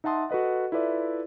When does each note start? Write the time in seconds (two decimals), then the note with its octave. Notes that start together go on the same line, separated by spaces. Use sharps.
0.04 D#4 E5 F#5 A5 C6 D#6
0.30 F#4 A4 B4 D#5 F#5
0.72 E4 F4 A4 B4 D5 E5